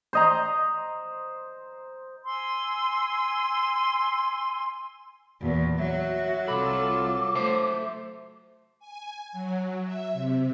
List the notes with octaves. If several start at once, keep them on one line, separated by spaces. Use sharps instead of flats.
C5 D#5 A#5
G#5 C6 E6
E2 A#2 F#4
F#3 F#4 E5
C2 F4 A4 B5 D6
A3 C5 E5 A5
G#5
F#3
E5
C3